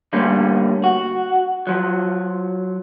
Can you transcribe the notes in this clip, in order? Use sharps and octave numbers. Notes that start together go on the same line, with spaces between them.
D3 G3 A3 A#3 C#4
F#4
F3 F#3